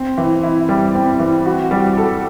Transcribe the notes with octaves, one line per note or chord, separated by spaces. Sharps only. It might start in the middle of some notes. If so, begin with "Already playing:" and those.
Already playing: C4
E3
E4
G3
C4
E3
F#4
G3
A4